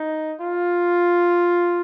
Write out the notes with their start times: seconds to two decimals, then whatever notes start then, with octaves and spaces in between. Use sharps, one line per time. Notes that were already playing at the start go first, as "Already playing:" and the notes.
Already playing: D#4
0.41 F4